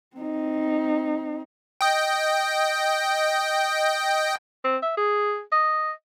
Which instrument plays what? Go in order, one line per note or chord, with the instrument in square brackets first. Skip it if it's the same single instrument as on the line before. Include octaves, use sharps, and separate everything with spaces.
[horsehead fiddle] C4 D#4
[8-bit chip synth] D#5 G5
[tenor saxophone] C4
E5
G#4
D#5